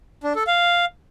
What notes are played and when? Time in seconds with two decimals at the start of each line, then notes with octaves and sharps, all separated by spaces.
0.24 D4
0.35 A4
0.47 F5